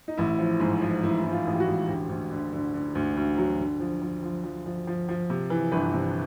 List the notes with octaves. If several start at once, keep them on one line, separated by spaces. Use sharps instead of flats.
D#4
A1 E4
F3
G#2
F3
A1 E4
G#2 E4
F4
A1
G4
F#4
A1
D2 G4
D2
D3
D3
D3
D2
D2
F#3
D3
F3
F3
F3
F3
F3
F3
F3
C3
E3
G1 B4
C3